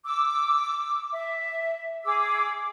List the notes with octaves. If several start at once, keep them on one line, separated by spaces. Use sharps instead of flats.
D6 E6
E5
G#4 D6 E6